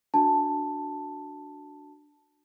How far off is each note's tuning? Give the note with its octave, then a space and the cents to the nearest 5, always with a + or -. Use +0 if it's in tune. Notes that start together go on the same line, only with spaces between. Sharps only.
D4 +0 F#4 +0 A5 +0